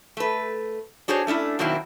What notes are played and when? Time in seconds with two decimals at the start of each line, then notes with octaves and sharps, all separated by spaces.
0.17 A3 B4
1.08 D4 F#4 G#4 C5 C#5
1.27 A3 C#4 D4 E4
1.59 B2 D#3 F#3 A#3 C4 E4